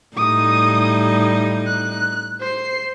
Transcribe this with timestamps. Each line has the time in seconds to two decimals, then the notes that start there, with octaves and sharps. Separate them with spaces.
0.17 A2 G3 D#4 D#6
1.67 F#6
2.40 C5 C7